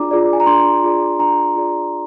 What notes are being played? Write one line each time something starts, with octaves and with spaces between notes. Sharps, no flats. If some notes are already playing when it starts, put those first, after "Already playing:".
Already playing: D4 F4 G#4 D5 A#5 D6
F4 G#4 D5
G#5
A#5
D4 C6
F4 G#4 D5
D4 A#5
F4 G#4 D5